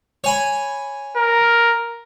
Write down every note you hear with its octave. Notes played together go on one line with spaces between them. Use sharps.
C#5 G#5 B5
A#4